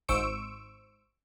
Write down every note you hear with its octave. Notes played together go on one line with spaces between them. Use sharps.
G#1 G#2 C5 C#6 E6 D7